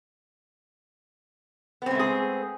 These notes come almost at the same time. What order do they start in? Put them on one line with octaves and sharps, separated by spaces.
B3 C4 G#3 A3 G#4